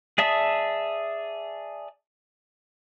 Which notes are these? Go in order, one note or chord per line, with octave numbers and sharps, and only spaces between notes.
G#4 D5 E5 A5 D#6